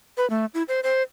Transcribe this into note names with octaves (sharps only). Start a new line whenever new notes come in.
B4
A3
E4
C5
C5